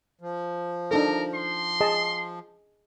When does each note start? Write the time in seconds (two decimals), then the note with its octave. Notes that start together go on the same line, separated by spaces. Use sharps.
0.21 F3
0.91 D4 D#4 A4 A#4
1.35 C6
1.81 G#4 D#5 A5